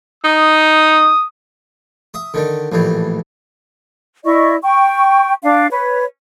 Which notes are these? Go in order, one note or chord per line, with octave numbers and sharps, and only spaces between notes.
D#4 D#6
E5 D#6
D3 D#3 D4
A#1 A2 E3 G3
E4 D5 D#5 C#6
G5 C#6
D4 F5
B4 C#5